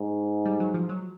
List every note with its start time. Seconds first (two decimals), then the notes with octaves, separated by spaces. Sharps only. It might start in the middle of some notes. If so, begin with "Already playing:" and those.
Already playing: G#2
0.46 G3
0.60 F#3
0.74 F3
0.89 F#3